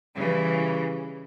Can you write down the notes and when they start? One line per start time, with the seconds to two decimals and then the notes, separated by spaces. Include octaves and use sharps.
0.16 C#3 E3 G3